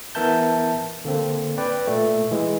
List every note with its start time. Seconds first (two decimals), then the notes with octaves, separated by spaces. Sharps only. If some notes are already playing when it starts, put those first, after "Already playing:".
0.15 E3 B3 A#4 E5 A5 G6
1.05 D3 A#3 C4
1.58 B4 D5 G5
1.87 A#2 A3
2.31 E3 G#3